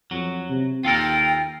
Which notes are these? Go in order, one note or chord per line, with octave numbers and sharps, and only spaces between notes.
F2 F#3
C3
D#2 F4 A4 A#4 G5